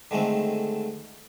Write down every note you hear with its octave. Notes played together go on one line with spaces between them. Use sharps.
D3 D#3 G#3 A3 C4